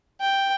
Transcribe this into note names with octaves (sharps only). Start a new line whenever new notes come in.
G5